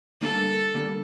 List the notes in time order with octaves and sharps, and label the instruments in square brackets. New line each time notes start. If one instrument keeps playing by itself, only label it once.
[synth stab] D3 G3 A#3 D4 [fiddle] A4
[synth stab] D3 G3 A#3 D4